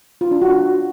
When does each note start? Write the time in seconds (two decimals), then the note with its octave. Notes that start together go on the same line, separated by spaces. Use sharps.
0.21 F4
0.31 D4
0.42 F#4